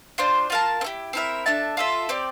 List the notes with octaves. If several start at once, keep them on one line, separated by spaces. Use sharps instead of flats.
D4 F4 C5
F4 A#4 F5 A5
C4
E4 G4
C4 E4 A#4 E5
D4 A4 E5 A5
F4 A4 E5
C4 G4 D5